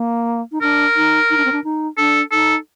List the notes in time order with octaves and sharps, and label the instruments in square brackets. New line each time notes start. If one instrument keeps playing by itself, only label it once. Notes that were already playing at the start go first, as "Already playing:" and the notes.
Already playing: [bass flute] A#3
D#4
[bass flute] D4 [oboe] A#4
[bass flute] D#4
D#4
D4
C4
D4
D#4
[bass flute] D4 [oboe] A4
[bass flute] D#4 [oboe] A4